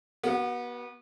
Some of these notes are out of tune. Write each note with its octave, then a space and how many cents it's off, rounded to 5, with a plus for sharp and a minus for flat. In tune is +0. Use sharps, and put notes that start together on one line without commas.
B3 -30 F#4 +30